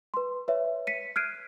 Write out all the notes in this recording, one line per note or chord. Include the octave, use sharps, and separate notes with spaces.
B4 C6
B4 C#5 E5
B6 C#7 D#7
F6 F#6 G#6 C7 D7 D#7